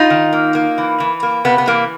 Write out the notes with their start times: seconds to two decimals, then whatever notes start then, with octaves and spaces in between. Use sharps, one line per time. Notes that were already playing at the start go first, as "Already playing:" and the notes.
Already playing: D#4 F4
0.10 D#3
0.33 A#3
0.55 A#3
0.78 E3
1.00 E3
1.23 A#3
1.45 C3 B3
1.58 B3
1.67 E3 A#3